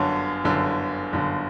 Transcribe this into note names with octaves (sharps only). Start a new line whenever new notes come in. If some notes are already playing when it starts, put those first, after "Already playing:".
Already playing: G1 F#2 D3 C#5
G1 F#2 D3
G1 F#2 D3